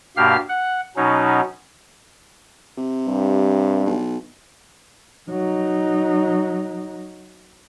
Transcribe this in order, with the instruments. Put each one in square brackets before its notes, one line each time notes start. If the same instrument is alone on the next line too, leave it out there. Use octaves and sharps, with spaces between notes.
[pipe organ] G2 B2 A#3 G4 F5 F6
F#5
B2 F#3 C#4 D#4
[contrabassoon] C3
[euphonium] G2
[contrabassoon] B1
[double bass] F#3 D#4